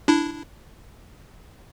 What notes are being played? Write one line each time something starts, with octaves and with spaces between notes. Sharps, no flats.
D4 E4